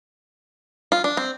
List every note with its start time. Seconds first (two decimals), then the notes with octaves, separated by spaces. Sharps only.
0.92 F4
1.04 D4
1.17 C4